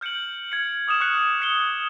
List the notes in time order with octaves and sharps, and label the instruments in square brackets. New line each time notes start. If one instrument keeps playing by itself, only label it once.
[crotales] F6 G6 C#7 D7 F#7
F6 G#6 C#7
D6 D#6 F6 E7
C#6 F6 F#6 C#7
F6 C#7 G7